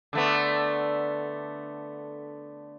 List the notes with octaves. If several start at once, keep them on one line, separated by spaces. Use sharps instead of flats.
D3 A3 B3